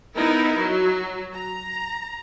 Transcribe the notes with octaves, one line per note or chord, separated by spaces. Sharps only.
B3 D#4 E4 A#4
F#3
A#5